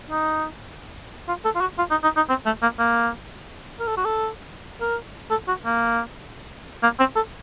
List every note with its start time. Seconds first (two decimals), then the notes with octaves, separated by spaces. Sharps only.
0.10 D#4
1.28 F4
1.45 A4
1.56 F4
1.61 F#4
1.78 F4
1.91 D#4
2.03 D#4
2.16 D#4
2.29 C4
2.46 A3
2.62 A#3
2.79 A#3
3.80 A#4
3.88 A4
3.97 F#4
4.05 A4
4.81 A#4
5.31 A4
5.48 F#4
5.65 A#3
6.83 A#3
6.99 C4
7.16 A4